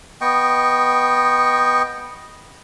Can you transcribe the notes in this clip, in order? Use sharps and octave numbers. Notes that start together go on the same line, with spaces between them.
B3 D#5 G5 C#6